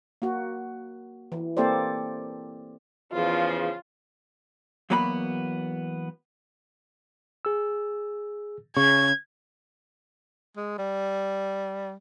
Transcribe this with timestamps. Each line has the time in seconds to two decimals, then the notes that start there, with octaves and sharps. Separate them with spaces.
0.22 A#3 F#4
1.32 E3
1.57 A#3 C4 G4 A4 C5 D5
3.13 E2 C#3 F3 F4
4.90 E2 F#3 A#3 B3 F#4 B5
7.45 G#4 E6
8.77 C#3 C#6 G#6
10.57 G#3
10.78 G3